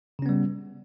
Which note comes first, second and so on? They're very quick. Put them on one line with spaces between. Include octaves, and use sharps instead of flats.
C#3 C#4 B3 G3